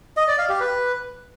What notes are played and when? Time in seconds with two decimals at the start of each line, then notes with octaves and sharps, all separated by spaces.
0.17 D#5
0.28 D5
0.39 F5
0.49 G4
0.60 B4